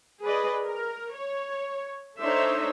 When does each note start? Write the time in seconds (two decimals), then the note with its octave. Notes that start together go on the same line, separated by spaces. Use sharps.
0.24 G#4 B4 D5 D#5
0.63 A#4
1.15 C#5
2.20 D4 D#4 A4 C5 C#5 E5